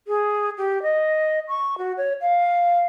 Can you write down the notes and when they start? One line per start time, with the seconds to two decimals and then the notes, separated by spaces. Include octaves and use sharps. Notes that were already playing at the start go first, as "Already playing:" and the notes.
0.08 G#4
0.58 G4
0.83 D#5
1.48 C#6
1.78 F#4
1.97 C#5
2.21 F5